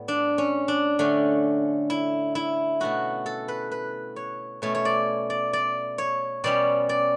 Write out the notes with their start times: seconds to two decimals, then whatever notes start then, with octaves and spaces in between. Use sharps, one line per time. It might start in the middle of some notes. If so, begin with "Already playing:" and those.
Already playing: A2 G3 B3
0.08 D4
0.38 C#4
0.68 D4
0.99 D3 A3 C#4
1.90 E4
2.35 E4
2.80 B2 A3 C#4 F#4
3.26 A4
3.48 B4
3.72 B4
4.16 C#5
4.62 B2 A3 C#4 C#5
4.75 C#5
4.85 D5
5.30 D5
5.53 D5
5.98 C#5
6.44 B2 G3 C#4 D5
6.89 D5